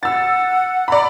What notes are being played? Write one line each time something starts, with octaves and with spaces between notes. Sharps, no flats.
F#5 E6 A6
D5 A#5 B5